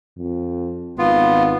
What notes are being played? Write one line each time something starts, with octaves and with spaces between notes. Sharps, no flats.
F2
G#1 B3 F4